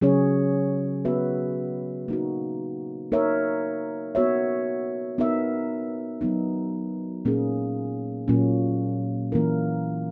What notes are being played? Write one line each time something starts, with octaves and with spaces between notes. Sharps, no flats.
C#3 F#3 C#4 G#4 C#5
B3 F#4 B4 E5
A#3 D#4 F#4
A#3 D#4 A#4 C#5 E5
B3 F#4 C#5 E5
B3 D#4 A#4 E5
F#3 B3 D#4
A#2 A#3 C#4 G#4
A#2 F#3 A#3 C#4
E3 A#3 C#4 E4 A#4